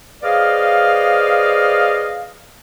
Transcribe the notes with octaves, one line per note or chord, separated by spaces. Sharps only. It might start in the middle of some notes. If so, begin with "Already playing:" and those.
G#4 B4 C5 D5 D#5 F5